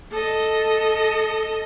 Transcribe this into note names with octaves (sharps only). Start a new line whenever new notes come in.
A4 D#5